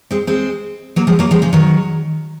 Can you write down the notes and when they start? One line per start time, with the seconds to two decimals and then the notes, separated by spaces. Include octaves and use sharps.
0.11 G#3 C4
0.27 G#3 C4
0.96 F#3 A#3
1.07 F3 G#3
1.19 F#3 A#3
1.31 F3 G#3
1.42 C#3 F3
1.53 D#3 F#3